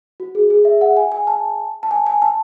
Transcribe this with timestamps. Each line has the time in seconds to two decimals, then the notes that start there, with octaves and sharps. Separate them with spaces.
0.20 F#4
0.35 G#4
0.50 G#4
0.65 E5
0.81 F#5
0.97 G#5
1.12 G#5
1.27 A5
1.83 A5
1.91 G#5
2.07 G#5
2.22 A5